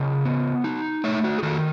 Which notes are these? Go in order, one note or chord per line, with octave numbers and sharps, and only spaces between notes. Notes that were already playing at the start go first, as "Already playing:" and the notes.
Already playing: C#3 D#5 F#5
B3
D#4
A3 C#5 E5
F#4
G#4
D#3 F#4 A4